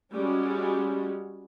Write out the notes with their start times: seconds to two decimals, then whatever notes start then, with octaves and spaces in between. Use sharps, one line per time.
0.12 G3 G#3 C#4 F#4